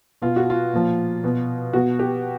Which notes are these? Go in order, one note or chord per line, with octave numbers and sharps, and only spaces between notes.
B2 F4
F#4
F4
A#2 F3
B2
B2 F#4
G4